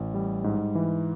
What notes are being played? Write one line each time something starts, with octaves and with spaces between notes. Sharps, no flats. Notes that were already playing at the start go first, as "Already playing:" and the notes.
Already playing: A1
G3
G#2
E3